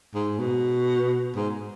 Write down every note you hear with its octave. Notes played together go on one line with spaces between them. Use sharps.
G#2
B2
G#2